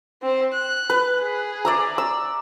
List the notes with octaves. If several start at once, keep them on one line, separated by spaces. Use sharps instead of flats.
C4 C5
F#6
B4
G#4
D5 E5 A#5
E6